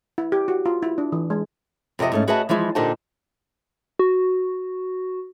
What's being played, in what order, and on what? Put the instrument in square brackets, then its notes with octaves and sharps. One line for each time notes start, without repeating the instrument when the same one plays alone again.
[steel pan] E4
G4
F#4
F4
E4
D4
E3
G#3
[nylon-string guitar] F2 C3 E4 D#5 E5
G#2 A3 C#4
F#4 G#4 B4 D#5 E5 A5
E3 F3 G#3 E4
A#2 D3 D#4 G4 C5 A5
[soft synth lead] F#4